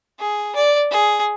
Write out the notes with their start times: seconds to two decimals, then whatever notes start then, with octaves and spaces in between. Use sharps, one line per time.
0.20 G#4
0.55 D5
0.91 G#4